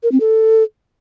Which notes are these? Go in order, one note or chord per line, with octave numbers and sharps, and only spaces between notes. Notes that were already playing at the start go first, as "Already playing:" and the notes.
A#4
C4
A4